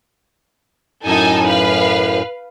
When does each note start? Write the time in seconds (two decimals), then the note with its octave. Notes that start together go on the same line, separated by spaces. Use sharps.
1.05 F#2 A2 D#4 A4 G#5
1.47 B4 F5